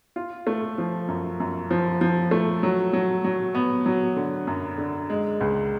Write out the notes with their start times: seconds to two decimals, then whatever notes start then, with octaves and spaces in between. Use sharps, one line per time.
0.16 F4
0.47 A3
0.78 F3
1.08 F#2
1.40 F#2
1.71 F3
2.01 F3
2.31 A3
2.63 F#3
2.93 F#3
3.24 F#3
3.55 B3
3.86 F#3
4.16 D3
4.47 F#2
4.78 D3
5.10 G#3
5.41 C#2